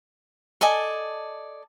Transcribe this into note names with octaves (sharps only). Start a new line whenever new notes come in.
A4 D5 D#5 G#5